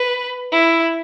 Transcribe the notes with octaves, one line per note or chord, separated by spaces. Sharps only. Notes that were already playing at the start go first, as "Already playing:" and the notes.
Already playing: B4
E4